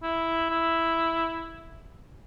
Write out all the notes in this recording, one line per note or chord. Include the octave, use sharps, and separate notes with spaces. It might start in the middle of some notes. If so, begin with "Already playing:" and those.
E4
E4